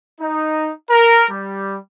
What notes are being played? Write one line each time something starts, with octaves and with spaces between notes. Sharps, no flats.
D#4
A#4
G3